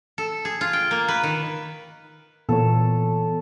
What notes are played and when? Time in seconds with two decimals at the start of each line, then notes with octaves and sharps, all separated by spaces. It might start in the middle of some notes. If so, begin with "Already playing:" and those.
0.18 A4
0.45 G#4
0.61 F4
0.73 G5
0.91 A#3
1.08 B4
1.23 D#3
2.49 A#2 E3 B3 A4 C#5